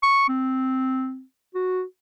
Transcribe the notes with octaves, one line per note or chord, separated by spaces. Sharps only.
C#6
C4
F#4